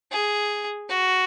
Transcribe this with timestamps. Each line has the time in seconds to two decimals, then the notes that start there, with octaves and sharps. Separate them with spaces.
0.12 G#4
0.89 F#4